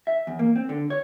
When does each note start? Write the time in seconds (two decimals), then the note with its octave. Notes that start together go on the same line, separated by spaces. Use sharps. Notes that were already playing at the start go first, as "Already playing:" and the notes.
0.07 E5
0.27 E2
0.39 A#3
0.56 C4
0.69 D3
0.90 C#5